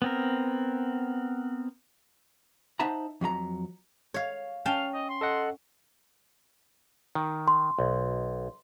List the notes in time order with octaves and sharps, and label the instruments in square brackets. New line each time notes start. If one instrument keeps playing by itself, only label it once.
[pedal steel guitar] B3 C4 A#4
[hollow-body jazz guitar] D#4 C5 E5 F#5 A5 A#5
F2 F#3 F4 A#5
[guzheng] C#5 F5
[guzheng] C#4 G5 A5 [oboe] F5
[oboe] D#5
C6
[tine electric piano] A4 D#5 F#5
[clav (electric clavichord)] D#3
[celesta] C6
[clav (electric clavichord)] B1